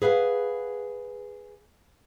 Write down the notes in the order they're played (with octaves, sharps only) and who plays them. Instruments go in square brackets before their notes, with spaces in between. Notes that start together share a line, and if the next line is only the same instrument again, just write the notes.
[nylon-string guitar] G#4 B4 F5 F#5